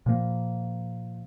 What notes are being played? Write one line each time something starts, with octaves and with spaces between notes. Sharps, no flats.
A#2 F3 A#3